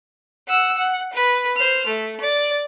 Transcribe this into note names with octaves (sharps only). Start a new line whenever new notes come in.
F#5 E6
F#5
B4
C5 F6
A3
D5